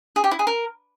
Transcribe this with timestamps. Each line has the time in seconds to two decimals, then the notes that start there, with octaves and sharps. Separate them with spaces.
0.16 G#4
0.24 G4
0.31 E4
0.39 G#4
0.47 A#4